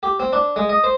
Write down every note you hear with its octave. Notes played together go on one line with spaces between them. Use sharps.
G4
C4
D4
G#3
D#5
C5